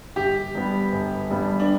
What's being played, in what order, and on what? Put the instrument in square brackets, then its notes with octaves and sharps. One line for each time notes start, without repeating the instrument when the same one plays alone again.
[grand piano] G1 [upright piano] G4
[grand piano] G2 G3 B3
G1
G2 G3 B3
[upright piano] D4